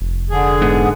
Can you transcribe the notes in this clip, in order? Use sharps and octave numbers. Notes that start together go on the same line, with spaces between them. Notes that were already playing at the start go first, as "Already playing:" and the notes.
F1
D3 G#4
G#2 B3